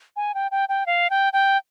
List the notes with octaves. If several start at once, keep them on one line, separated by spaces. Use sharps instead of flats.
G#5
G5
G5
G5
F5
G5
G5